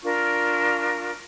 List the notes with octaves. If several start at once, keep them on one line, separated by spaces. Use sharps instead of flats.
D4 F4 A#4 C#6